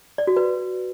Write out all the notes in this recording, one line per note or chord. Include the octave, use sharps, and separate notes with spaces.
D5
F#4
B4